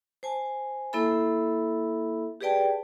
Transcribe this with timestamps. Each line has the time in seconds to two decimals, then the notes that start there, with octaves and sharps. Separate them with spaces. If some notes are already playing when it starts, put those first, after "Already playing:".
0.23 C5 G#5 A5
0.93 A#3 E4 A4 E5 B5
2.41 G4 G#4 B4 D5 G5 A5